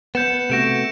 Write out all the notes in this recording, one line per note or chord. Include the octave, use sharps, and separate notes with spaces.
B3 G6 C#7 E7
C3 A3 F#4 A#6 D7 E7